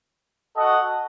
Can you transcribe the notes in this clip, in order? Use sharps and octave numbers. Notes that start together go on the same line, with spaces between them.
F#4 A4 D#5 F#5